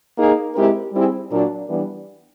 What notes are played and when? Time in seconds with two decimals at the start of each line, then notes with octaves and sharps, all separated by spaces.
0.17 A#3 D#4 G#4
0.55 G#3 C4 E4 G4 A#4
0.92 G3 C4 E4 G#4
1.30 A#2 F#3 A#3 D4
1.68 E3 G3 B3 D4